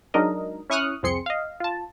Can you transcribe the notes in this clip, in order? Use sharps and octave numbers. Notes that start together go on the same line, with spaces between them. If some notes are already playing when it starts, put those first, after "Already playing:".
F#3 G#3 D4 D#4 A#4 D#5
C#4 E4 C#6 D#6 F6 F#6
C2 F2 C4 G#4 C6 C#7
D#5 F5
F4 A5